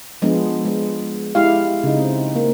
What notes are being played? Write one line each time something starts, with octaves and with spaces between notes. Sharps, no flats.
F3 G#3 B3 D4
G#3
G#3 E4 G4 F5
C#3 D#4
C4
A#3